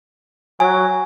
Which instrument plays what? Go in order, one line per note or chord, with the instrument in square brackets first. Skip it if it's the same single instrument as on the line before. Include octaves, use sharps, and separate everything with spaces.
[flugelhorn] F#3 [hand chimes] G#5